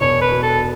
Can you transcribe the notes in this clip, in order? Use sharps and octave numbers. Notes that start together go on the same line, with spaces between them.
E1 C#5
B4
B2
A4